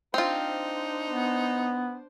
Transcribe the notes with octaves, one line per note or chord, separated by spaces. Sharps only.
C4 D4 D#4 F4 C5
B3